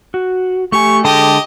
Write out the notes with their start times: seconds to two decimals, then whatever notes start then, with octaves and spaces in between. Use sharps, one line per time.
0.14 F#4
0.72 A3 G4 G#5 C#6
1.05 D3 G#3 G4 A4 D#5 A5